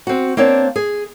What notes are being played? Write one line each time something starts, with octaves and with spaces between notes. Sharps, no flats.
C4 F#4
A#3 C4 D4 C#5
G#4